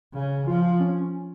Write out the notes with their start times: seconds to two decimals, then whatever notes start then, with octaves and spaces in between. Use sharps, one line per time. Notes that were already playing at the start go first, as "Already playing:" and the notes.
0.13 C#3
0.47 F3 F4
0.80 C#4